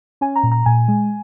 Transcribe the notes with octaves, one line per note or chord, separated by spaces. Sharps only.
C#4 G#5
A#5
A#2
A#5
A#2 G#5
G#3